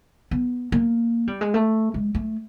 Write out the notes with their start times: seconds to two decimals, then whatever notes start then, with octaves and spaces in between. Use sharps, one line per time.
0.31 B3
0.72 A#3
1.27 G3
1.41 G#3
1.54 A3
1.94 G#3
2.14 A3